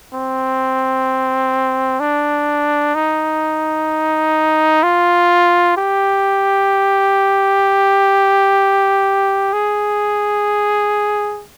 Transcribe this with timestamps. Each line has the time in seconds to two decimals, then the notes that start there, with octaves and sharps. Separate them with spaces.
0.13 C4
2.00 D4
2.95 D#4
4.83 F4
5.77 G4
9.53 G#4